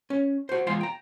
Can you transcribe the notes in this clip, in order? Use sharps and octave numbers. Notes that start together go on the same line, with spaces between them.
C#4
F#4 C5
E2 G#3 F4 F5 C6
G5 A#5